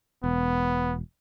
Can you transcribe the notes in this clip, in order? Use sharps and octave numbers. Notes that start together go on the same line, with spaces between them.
E1 B3